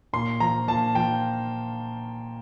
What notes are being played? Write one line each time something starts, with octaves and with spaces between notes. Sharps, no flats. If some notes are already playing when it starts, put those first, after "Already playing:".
A#2 C6
F3 A#5
A#2 A5
F3 G5